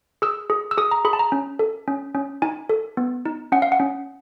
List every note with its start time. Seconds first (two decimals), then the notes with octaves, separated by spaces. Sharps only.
0.22 G#4 E6
0.50 G#4
0.71 E6
0.77 G#4 D#6
0.91 A#5
1.05 G#4 B5
1.13 A5
1.19 A#5
1.32 C#4
1.59 A4
1.88 C#4
2.15 C#4
2.42 D#4 G#5
2.69 A4
2.97 B3
3.25 D#4
3.52 C#4 F#5
3.62 F5
3.72 F#5
3.80 C#4